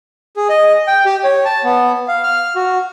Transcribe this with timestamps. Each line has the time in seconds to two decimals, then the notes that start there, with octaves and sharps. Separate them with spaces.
0.36 G#4
0.49 D#5
0.87 G5
1.05 G4
1.24 C#5
1.45 A5
1.64 B3
2.08 F5
2.23 F6
2.55 F#4